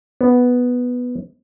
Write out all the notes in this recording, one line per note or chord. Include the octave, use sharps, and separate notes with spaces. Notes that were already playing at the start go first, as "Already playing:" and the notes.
B3